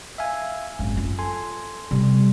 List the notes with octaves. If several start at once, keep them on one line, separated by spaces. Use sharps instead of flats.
E5 F5 G#5
G#1 F#2
F4
A4 G#5 C6
C3 G3